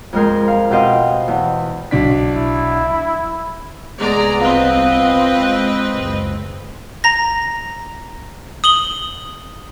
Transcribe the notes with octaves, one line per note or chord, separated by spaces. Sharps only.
F2 F3 G#3 F4 A#4 C5
F5
B2 C4 G4 C5 D#5 F5
E2
B1 D4 B6
E4
C2 G#3 B3 D5 A#5
C4 F4 B4 D#5
G#3
F#1 C#2
A#5 A#6
D#6 F#7 G7